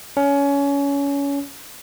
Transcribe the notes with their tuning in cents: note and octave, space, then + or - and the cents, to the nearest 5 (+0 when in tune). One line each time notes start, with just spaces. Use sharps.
C#4 +25